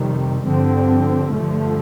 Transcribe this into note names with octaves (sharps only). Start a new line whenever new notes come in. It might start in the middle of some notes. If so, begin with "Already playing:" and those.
Already playing: F2 C3 D#3 G3
G2 D3 F3 C4
G2 D3 F3 A3